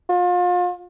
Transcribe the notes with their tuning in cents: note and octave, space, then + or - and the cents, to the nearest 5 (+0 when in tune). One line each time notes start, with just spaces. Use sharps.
F4 +35